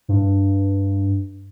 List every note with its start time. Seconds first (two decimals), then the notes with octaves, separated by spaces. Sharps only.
0.09 G2